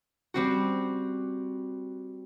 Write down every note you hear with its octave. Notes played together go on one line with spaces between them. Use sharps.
G3 C4 F#4